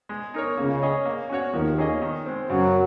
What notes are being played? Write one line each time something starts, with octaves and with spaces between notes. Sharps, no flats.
G#3
D#4 A#4 C#5
C#2 C#3 A#3
C#4 G#4 D#5
A#3
C#4 F#4 C#5
D#2 D#3 F3
A#3 C#4 G#4 D#5
D#3
G#3 C4
F#2 C#3 F#3